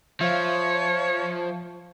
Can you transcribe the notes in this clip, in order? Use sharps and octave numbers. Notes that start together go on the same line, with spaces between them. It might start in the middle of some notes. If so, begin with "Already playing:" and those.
F3 C5 C#5 E5 F5